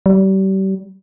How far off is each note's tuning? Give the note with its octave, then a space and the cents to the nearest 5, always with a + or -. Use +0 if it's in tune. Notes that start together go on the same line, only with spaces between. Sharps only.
G3 -35